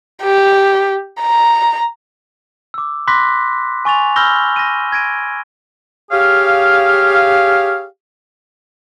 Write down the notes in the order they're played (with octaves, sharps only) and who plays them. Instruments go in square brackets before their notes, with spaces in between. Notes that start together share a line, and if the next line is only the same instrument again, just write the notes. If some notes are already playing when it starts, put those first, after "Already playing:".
[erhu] G4
A#5
[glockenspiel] D6 E6
B5 C6 D6 F#6 A#6 B6
G#5 C#6 A6 F7
B5 E6 F6 G6 A#6 G7
A#6 D#7
G#6 A#6 D7 D#7
[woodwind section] G4 G#4 C#5 F5